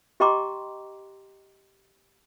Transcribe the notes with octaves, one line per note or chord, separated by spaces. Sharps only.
G4 D#5 G5 A#5 C6 D6